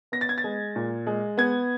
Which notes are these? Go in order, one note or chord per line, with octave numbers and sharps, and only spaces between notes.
B3 A#6
A6
G#6
A6
G#3
A#2
G#3
B3 G#6